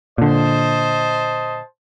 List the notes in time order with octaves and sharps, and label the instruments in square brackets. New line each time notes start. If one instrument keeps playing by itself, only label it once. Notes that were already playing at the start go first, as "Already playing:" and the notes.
[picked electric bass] A#2 D3 [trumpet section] C5 D#5 A5